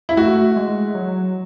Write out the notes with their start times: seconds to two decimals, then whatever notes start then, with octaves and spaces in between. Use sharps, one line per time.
0.09 E4
0.17 A3 F#4
0.56 G#3
0.95 F#3